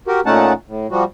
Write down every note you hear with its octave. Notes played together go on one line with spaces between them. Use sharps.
F#4 G4 A#4
A#2 A3 C#4 D#4 F#5 A5
A2
F3 G3 F#4